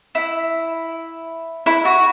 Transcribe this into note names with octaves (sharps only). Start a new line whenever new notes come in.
E4
E4
F#4